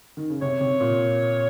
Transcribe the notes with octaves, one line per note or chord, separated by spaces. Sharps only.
D#3
C#3
C3 C#5
C3
A#2